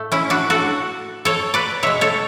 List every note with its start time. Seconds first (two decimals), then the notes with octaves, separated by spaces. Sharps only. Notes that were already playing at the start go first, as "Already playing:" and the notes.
Already playing: A2 A3
0.12 C#4 E4
0.30 D4 F#4
0.50 F#4 A4
1.25 A4 C#5
1.54 B4 D5
1.83 B2 G#3 C#5 E5
2.01 A4 C#5